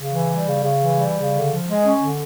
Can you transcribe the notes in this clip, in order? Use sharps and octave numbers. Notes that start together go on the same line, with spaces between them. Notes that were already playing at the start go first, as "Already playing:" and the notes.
Already playing: C#3
E3
G3
C#3
C#3
E3
G3
C#3
D3
F3
G#3
C#4
D3